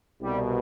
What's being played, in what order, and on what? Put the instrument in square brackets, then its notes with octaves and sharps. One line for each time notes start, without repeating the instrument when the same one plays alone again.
[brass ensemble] C2 B2 G3